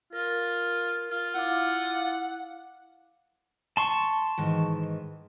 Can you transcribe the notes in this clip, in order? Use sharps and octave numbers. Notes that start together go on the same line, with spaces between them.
F4 A#4
F4
E4 F5 F#5 D6
A5 C6 C#6
G#2 D#3 E3